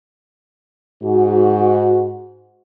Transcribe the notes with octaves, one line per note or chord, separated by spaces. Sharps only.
G#2 F#4